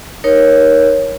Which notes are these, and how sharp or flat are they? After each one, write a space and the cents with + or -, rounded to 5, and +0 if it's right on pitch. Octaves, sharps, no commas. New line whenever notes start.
D#4 +0 A#4 +20 C#5 +0